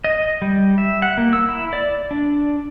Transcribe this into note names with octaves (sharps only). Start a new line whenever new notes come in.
D#5
G3
E5
F#5
A#3
E6
E4
D5
D4